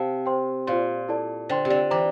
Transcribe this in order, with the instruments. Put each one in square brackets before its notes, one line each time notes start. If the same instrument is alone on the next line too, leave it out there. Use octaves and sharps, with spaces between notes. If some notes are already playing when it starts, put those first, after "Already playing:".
Already playing: [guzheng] C3 [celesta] C5 F5 A5
[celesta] C5 G5 C6
[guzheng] A#2 [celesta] F4 C5 F5 C6
[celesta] E4 A4 D5 A5
[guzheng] D3 [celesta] C5 G5 C6
[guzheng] C3
D3
[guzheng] E3 [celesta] C5 G5 A#5 D6